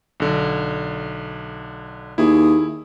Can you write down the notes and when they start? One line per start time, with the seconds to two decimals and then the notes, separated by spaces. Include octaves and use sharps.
0.20 B1 D3
2.18 D#2 E4 G#4